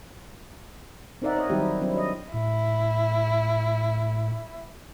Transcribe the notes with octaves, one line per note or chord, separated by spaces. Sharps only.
C4 D#4 A#4 D5 E5 F#5
D#4 C#5 D#5
D#3 F#3 G3 C4 E4 G4
F#3 C4 D4 E4
D#5
A2 E4